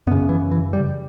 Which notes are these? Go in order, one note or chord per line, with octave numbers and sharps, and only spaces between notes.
F#2 C#3 B3
E3
E3
G3